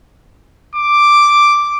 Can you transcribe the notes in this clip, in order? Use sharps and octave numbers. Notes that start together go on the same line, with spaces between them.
D6